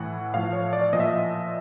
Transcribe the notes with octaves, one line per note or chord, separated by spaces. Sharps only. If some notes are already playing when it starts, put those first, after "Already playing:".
Already playing: A2 E3 F#5
A2 F3 F5
C#5
D5
A#2 F3 D#5
E5
D#5